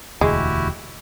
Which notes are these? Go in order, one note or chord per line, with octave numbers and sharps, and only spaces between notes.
E1 D2 G#3 E4 F#4 G4